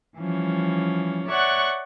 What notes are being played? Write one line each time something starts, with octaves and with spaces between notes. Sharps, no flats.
E3 F3 G3 C#4
C#5 D5 E5 F#5 C#6 F#6